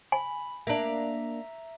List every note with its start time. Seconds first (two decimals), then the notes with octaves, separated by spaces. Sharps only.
0.12 G#5 B5
0.67 A#3 D4 E5 A#5